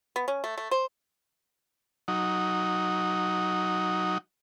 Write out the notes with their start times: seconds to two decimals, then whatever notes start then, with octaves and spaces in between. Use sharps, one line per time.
0.16 B3
0.28 C#4
0.44 A3
0.58 A3
0.71 C5
2.08 F#3 D#4